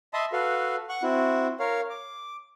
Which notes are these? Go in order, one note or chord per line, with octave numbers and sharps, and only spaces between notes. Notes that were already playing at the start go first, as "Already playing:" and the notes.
D#5 E5 A5 B5 C6 D#6
F#4 A4 B4 F5
F#5 C#6 F#6
C4 E4 F#4
A#4 C#5 F5
D6